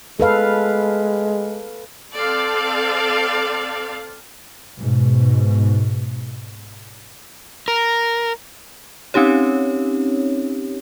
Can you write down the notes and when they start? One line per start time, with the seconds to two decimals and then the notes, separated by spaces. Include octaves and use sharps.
0.20 G#3 A4 B4 F5
2.15 C4 A4 D5 F5
4.78 G#2 B2
7.68 A#4
9.14 C4 C#4 D#4 G4 C#5